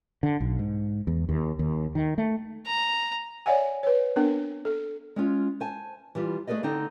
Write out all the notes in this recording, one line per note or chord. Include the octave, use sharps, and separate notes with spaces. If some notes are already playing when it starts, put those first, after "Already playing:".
D3
B1
G#2
E2
D#2
D#2
D#3
A3
A#5
C#5 D5 E5 F#5 G#5
B4 C#5
B3 C4 D4 A#4
A4
G#3 C#4 F4
C5 G#5 A5
E3 G3 F4
A3 G#4 A4 B4 D5 D#5
D3 C4 D#4